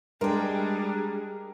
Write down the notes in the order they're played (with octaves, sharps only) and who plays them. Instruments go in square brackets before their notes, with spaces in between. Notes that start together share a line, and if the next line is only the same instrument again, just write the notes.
[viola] G3 G#4 [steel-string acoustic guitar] G#3 G5 [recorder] D4 [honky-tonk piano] A#4